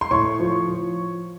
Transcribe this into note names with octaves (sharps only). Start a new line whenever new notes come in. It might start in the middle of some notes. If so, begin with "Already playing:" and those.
C6
A2 C#5 C#6
F3
F3